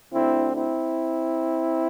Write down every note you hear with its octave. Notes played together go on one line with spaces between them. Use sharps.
D2 D3 C4 E4
C4 E4